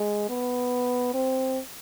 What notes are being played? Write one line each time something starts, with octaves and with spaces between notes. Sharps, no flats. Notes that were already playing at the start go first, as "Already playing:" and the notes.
Already playing: G#3
B3
C4